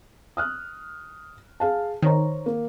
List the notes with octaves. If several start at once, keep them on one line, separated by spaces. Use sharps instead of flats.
D#6 F6 F#6
G#4 F5 A5
D#3 C5 C#5 A#5
A#3